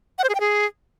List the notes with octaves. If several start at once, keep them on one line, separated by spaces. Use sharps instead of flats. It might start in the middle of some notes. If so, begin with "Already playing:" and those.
F#5
C5
G#4
G5
G#4